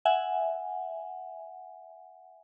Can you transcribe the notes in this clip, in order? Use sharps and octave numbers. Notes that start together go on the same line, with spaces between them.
E5 F#5 G#5